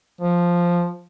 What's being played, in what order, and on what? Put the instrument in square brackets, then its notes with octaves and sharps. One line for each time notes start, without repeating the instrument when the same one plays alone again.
[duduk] F3